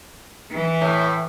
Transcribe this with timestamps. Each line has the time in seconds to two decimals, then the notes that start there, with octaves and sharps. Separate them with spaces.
0.51 E3
0.81 A2